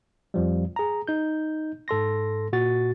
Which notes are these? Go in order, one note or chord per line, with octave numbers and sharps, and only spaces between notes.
F2 F3 G3
G#4 A#5
D#4 G6
G#2 A4 C6 A#6
A#2 F#4 A6